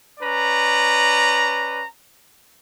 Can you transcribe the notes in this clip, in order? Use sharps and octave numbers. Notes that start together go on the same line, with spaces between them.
C#4 B4 D5 A#5